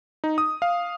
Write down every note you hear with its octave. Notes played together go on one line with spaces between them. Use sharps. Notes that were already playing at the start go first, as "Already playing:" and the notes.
D#4
D#6
F5